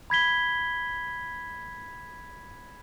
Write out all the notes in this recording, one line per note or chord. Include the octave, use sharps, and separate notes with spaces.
B5 G#6 B6 G7